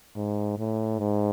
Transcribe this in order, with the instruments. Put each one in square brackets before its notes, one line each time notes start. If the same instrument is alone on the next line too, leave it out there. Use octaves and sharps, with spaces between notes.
[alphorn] G#2
A2
G#2